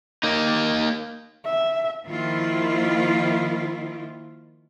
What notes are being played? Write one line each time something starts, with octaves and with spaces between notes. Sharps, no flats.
A#3 D#4
E5
D#3 F3 A#3 E4 F4